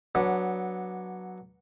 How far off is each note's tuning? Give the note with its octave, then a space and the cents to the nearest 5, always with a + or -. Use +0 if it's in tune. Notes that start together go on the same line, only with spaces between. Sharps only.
F#3 +0 B3 -15 D4 +0